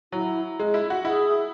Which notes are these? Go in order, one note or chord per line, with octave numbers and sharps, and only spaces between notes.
F#3 E4
G#3
E4
F#4
E4 G#4